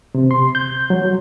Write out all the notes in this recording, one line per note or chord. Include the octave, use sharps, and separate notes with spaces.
C3
C6
G6
F#3